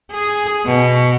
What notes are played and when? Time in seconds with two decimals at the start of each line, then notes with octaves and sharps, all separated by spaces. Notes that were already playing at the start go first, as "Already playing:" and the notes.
0.12 G#4
0.65 B2